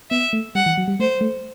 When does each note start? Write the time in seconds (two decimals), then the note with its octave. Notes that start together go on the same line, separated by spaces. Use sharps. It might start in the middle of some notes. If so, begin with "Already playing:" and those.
0.10 B3 E5
0.33 A3
0.55 G3 F#5
0.66 E3
0.78 F#3
0.88 G3
1.00 A3 C5
1.21 A3